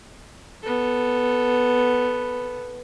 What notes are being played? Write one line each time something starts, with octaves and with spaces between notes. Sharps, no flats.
B3 A4